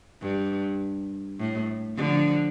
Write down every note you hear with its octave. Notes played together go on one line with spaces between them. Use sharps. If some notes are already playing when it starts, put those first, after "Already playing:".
G2
A2
D3 F3